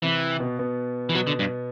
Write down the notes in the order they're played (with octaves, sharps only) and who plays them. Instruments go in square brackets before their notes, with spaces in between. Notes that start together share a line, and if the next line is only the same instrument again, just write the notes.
[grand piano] C3 C4 [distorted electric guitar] E3
[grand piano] B2 B3
B2 B3
[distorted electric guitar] E3
[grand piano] B2 B3 [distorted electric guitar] F#3
[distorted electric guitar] D3
G2